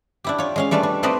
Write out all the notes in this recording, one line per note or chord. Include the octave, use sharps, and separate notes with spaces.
D4 E4 G4
F4 C#5
G#3 C#4 F5
G3 A3 D4 F4 B4
D4
A3 C4 D#4 B4 D5 D#5